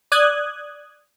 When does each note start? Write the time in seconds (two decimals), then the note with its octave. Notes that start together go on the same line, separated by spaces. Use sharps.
0.12 D5 D#6 F#6 G#6